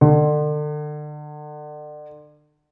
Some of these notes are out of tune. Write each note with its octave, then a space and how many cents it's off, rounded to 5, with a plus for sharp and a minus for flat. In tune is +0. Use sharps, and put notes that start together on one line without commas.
D3 +35